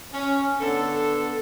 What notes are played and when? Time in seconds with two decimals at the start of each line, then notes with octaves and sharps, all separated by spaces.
0.13 C#4
0.60 D3 B3 A4